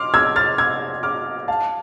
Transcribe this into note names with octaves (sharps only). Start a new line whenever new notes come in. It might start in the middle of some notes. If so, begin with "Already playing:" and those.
Already playing: C6 D6 F6
E6 G#6
F6 A6
E6 G#6
D6 F6
F5 A5